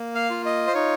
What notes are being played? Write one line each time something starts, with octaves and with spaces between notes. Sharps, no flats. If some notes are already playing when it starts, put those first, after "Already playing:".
Already playing: A#3
F5
F4
D#5
C5
D#4 C#5